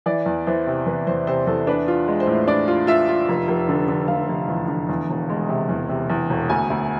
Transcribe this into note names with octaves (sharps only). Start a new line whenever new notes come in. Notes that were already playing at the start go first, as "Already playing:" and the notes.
E3 D5
E2
E3 C5
C3
E2 B4
E2 C5
C3 C5
E2 A4
D4 B4
F4
G#3
C5
A2
D4 D5
F4
F4 E5
F4
F1
F1
D3
D3
F1 F5
F1
E2
D3
E2
E1
G#3
C3
E2
C3
E2
E1
D2 G#5
D2